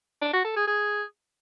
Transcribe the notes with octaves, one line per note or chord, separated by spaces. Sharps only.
D4
F#4
A4
G#4
G#4